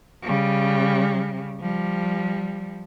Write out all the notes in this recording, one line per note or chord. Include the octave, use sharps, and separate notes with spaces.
C#3 G3
F3 G3